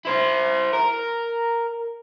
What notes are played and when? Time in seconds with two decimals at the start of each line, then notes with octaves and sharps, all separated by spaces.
0.05 E4 C5
0.73 A#4